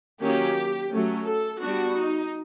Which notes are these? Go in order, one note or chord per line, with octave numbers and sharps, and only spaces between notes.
D#3 F#3 A#3 C#4 G4
F#3 A3 C#4
A4
G3 B3 D4 F#4
D#4